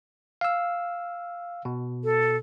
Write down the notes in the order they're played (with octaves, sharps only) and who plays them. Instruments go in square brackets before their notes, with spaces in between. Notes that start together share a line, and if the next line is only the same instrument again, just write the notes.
[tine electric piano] F5 E6
B2
[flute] A4